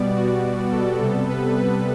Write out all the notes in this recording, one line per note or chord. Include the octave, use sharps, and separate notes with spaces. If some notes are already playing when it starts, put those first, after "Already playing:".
Already playing: B2 G3 B3 D5
F#4
A4
C3 G3 B3 A4
B4
B4